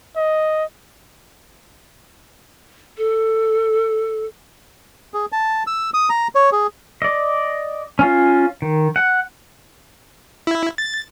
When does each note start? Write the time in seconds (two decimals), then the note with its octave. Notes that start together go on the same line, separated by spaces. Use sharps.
0.17 D#5
2.98 A4
5.14 G#4
5.32 A5
5.67 E6
5.94 D#6
6.10 A#5
6.35 C#5
6.52 G#4
7.02 D5 D#5
7.99 C#4 F4
8.62 D#3
8.96 F#5
10.47 E4
10.78 A6